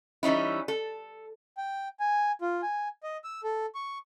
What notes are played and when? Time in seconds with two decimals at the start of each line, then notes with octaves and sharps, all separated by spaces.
0.23 E3 G3 C#4 D#4 E4
0.68 A4
1.57 G5
2.00 G#5
2.42 F4
2.62 G#5
3.03 D#5
3.24 E6
3.44 A4
3.75 C#6